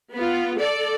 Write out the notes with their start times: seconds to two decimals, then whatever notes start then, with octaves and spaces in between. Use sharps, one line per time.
0.14 B3 F4
0.58 A4 D5